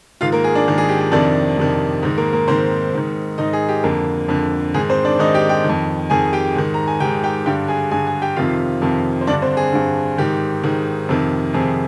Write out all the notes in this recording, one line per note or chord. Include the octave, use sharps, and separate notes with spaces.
G#2 D#3 F4 F5
A#3 A#4
G#4
D4 D5
G#2 D#3
G#4
G4
G#4
F2 C3 D#3 D4 D5
F2 C3 D#3
G#2 D#3
A#3 A#4
A#3 A#4
G#2 D#3 C4 C5
G#2 D#3
G#2 D#3 D#4 D#5
G#4
G4
F2 D3 A#3 A#4
F2 D3
G#2 D#3 G#4
C4 C5
D4 D5
G#2 D#3 D#4 D#5
G4 G5
G4 G5
F2 D#3
F2 D#3 G#4 G#5
G4 G5
G#2 D#3
A#5
G#5
G#2 D#3 G4 G5
G4 G5
G2 D3 G4 G5
G#4 G#5
G2 D3 G#4 G#5
G#4 G#5
G4 G5
F2 C3 D#3 F4 F5
F2 C3 D#3
C5
G2 D3 D4 D5
C4 C5
G#4
G2 D3
G#2 D#3 G4
G#2 D#3
F2 C3 D#3
F2 C3 D#3 G#4